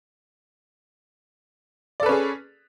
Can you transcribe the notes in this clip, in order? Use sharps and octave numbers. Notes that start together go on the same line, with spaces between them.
C#4 G#4 A4 B4 D5